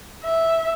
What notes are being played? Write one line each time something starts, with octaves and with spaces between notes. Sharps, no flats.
E5